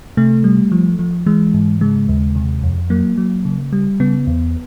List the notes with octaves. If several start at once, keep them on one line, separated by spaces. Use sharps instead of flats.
C3 A3
G3
F3
F3
E3 G#3
G#2
C#3 G#3
D#2
C3
F2
F#3 A#3
F#3
C#3
G3
C#3 B3
E2